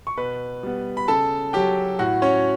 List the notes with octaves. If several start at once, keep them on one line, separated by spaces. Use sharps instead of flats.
C#6
B2 B4 B5
G3 B3
B5
C#3 A4 A5
F#3 C#4 G4 G5
A2 F#4 F#5
C#4 C#5